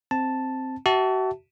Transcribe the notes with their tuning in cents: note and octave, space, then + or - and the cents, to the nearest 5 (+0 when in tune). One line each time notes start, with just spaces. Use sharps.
C4 +0 A5 +0
F#4 +35 E5 -5 A5 +0